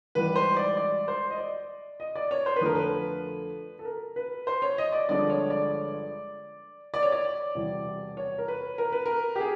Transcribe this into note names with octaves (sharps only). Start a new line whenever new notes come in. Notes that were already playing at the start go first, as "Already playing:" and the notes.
A1 G#2 E3 G3 B4
C5
D5
D5
C5
D#5
D5
D#5
D5
C#5
C5
B4
F2 D3 F3 A3 A#4
B4
A4
A#4
B4
C5
C#5
D#5
D5
G1 G2 D3 F3 G#3 D5
C#5
D5
D5
C#5
D5
E1 E2 C3 E3 G3
C#5
A#4
B4
A#4
B4
A#4
G4
G#4